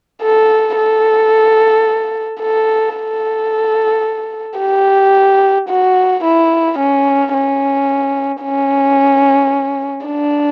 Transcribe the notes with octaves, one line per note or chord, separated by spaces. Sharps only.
A4
A4
A4
A4
G4
F#4
E4
C#4
C#4
C#4
D4